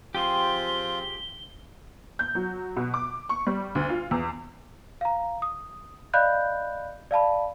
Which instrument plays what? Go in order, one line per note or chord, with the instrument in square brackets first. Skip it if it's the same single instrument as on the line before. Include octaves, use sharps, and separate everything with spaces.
[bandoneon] F3 C4 [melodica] F4 [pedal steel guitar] G4 G#4 C6 [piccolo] G7
[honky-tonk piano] G6
F#3
B2
D6
C#6
G3
D2
F4
E2
[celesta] F5 A#5
D#6
D5 D#5 F5 B5 F#6 G6
D5 F5 A5 B5